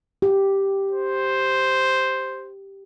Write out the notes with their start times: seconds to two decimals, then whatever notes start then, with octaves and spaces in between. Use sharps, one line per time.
0.22 G4
0.92 C5